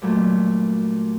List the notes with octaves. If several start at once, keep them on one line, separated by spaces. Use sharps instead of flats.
G2 A#2 F#3 A3